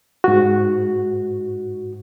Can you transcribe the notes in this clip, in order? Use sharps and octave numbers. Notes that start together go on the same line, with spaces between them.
G#2 F#4